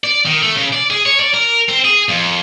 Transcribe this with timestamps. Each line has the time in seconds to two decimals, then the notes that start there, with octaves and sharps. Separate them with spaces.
0.04 D5
0.25 D#3
0.42 A3
0.56 C#3
0.73 D5
0.90 G#4
1.06 C#5
1.20 D5
1.34 A#4
1.69 C4
1.84 G#4
2.09 F2